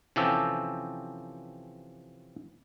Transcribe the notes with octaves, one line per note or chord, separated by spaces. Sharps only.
C3 E3 F3 C#4 G4 A4